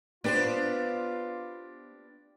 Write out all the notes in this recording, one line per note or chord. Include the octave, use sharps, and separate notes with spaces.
B3 D4 F4 G4 B4 C5